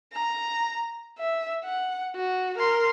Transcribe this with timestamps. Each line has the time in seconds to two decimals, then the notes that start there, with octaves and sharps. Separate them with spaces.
0.13 A#5
1.19 E5
1.64 F#5
2.16 F#4
2.58 A#4 C6